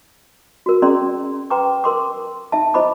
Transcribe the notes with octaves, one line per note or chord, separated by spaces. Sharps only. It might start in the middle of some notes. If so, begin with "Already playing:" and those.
F#4 A#4
C#4 G#4 A#4 D5 A#5 C6
B4 G5 A#5 C6 D6
A#4 C6 D6
D#4 E5 A5
E4 C5 D#5 B5 D6